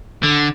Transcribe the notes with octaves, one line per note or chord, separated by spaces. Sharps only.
D3